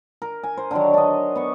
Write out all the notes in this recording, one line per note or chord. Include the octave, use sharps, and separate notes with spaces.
A#4
G#5
C5
D3 D#3 F#3
D4 D#5
B3 C#6